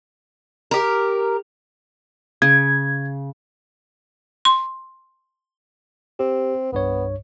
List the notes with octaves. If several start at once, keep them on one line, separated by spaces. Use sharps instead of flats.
G4 A#4
C#3 G#6
C6
C4 G4
C2 G2 B3 C#5